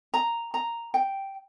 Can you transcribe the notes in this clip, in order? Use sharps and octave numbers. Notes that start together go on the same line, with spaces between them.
A#5
A#5
G5